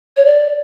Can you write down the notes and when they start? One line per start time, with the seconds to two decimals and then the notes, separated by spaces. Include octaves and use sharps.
0.17 C#5
0.25 D5